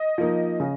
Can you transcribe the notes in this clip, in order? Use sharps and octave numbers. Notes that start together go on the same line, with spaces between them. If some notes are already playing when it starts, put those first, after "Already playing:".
Already playing: D#5
F3 A#3 D#4
C#3